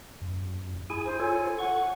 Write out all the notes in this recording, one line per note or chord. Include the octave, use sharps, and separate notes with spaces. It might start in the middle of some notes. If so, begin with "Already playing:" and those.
F#2
E4 G#4 G#5
C5
F4 A4 C#5 G#5
F#5 C#6